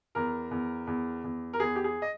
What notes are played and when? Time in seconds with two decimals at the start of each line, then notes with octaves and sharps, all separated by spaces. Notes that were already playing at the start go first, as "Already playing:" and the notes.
0.15 E2 A#4
0.51 E2
0.87 E2
1.24 E2
1.53 A#4
1.60 E2 G#4
1.76 G4
1.84 G#4
2.02 D#5